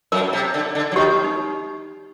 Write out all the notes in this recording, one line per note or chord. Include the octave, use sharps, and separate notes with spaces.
F#2 F#3 A#4
C3
D3
D3
F#3
D#2 D#3 G4
D#4